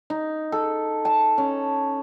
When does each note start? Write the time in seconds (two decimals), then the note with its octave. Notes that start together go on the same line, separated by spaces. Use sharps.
0.10 D#4
0.52 A4
1.05 A5
1.38 C#4